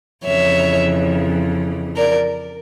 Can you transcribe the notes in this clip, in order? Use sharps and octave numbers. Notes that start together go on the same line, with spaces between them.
F2 C#3 E3 C#5 E5
A#4 D5